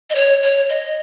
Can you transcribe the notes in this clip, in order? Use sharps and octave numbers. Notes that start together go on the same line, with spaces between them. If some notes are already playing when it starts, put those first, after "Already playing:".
D#5
C#5
C#5
D#5